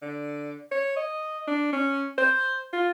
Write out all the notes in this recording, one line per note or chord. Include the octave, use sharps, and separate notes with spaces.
D3
C#5
D#5
D4
C#4
C5
F4